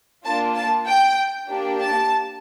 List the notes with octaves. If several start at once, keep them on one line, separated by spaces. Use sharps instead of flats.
A#3 D4 F4 A5
A5
G5
A#3 D4 G4
A5